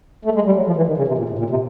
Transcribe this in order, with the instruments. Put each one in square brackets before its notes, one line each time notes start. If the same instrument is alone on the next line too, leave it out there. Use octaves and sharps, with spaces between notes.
[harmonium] A3
G#3
G3
F#3
F3
E3
D#3
C#3
C3
A#2
A2
A#2
C3